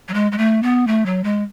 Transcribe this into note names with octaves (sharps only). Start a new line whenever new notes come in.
F#3
G#3
G#3
A3
B3
A3
F#3
G#3